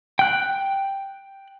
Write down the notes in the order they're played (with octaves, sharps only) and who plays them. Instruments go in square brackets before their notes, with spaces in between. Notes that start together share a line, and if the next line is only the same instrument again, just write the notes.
[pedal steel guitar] G5 F#6